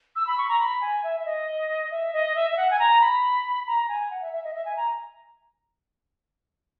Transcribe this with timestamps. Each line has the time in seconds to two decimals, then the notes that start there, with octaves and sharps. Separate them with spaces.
0.16 E6
0.27 B5
0.38 C#6
0.48 A#5
0.59 B5
0.81 G#5
1.04 E5
1.20 E5
1.25 D#5
1.91 E5
2.13 D#5
2.35 E5
2.51 E5
2.57 F#5
2.70 G#5
2.79 A#5
3.01 B5
3.67 A#5
3.89 G#5
4.11 F#5
4.21 E5
4.33 E5
4.44 D#5
4.54 E5
4.65 G#5
4.77 A#5